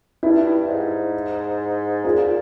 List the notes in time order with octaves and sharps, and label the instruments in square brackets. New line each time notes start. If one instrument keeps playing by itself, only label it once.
[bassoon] G2 [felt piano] E4
[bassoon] G#2
[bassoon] A#2 [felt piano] F4 G#4